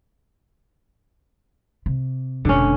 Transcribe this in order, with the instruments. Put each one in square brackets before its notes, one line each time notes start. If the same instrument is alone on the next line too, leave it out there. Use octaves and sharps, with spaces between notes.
[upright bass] C3
[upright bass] F1 B2 [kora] D3 C#4